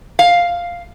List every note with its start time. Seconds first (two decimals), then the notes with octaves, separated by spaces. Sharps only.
0.19 F5